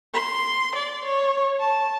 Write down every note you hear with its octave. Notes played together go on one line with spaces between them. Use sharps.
C6
D5
C#5
A5